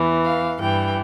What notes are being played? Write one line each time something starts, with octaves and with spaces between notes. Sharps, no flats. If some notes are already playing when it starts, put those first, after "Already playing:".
Already playing: E2 E3
F5
G2 E3 G5